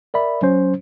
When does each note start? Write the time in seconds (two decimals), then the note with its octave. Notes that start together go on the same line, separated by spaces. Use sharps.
0.14 A#4 D5 E5 B5
0.42 F#3 C#4 C5